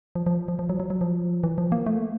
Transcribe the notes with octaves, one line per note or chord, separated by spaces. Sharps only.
F3
F3
F3
F3
F#3
F#3
F#3
F3
E3
F3
A#3
A3